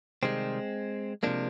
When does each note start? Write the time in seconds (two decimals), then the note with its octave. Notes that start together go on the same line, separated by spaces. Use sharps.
0.23 C3 D#3 G3 G#3 C4
1.23 C3 F3 G#3 A#3 D4